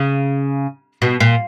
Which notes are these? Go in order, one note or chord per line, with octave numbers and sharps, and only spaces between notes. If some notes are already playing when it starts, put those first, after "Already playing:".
Already playing: C#3
B2
A#2